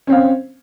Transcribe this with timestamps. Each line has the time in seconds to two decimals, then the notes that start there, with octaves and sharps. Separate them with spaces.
0.07 C#4
0.10 C4
0.12 F5